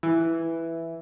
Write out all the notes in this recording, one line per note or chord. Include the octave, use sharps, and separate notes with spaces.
E3